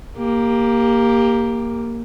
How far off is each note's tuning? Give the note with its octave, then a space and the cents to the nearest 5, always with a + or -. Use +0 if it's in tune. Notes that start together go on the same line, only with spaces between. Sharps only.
A#3 +0 G4 +15